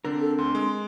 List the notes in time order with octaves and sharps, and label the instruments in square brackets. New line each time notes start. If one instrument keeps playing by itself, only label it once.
[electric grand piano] D3 [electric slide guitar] C4 D4 A#4
[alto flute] A4
[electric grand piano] D2 [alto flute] C6
[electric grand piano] G#3